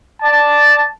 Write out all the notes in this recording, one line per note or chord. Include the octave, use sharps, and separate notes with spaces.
D5 A5